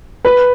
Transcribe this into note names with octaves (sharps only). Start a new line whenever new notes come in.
B4